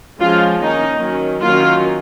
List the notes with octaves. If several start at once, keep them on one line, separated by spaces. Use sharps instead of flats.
F3 G#3 C#4 F4
D#3 A#3 C#4 D#4
D#3 F#3 C#4
D#3 F#3 A#3 C#4 F4